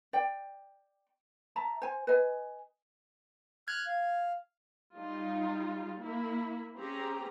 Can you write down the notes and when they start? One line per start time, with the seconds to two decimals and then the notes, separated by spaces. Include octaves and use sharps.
0.13 D5 G5
1.56 E5 A5 A#5
1.82 C5 G#5
2.07 B4 D#5 G#5
3.68 F6 F#6 G#6
3.86 F5
4.96 G3 D#4 F4
5.99 A#3 E4 B5
6.75 C4 C#4 G4 G#4 A#5